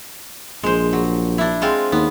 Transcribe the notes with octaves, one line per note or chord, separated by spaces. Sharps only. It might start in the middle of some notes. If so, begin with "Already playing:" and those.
A#1 G#3 C5
F#3
D4 E4
G#3 C4 F4
D#2 B3